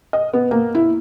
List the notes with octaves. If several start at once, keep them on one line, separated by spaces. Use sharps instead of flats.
D#5
B3
A#3
E4